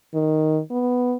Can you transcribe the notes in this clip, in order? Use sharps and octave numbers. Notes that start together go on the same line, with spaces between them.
D#3
B3